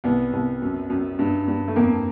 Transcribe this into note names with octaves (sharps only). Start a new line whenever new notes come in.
C2 B3
C2
F#2
F#2
G2
G2
A3
F2 A#3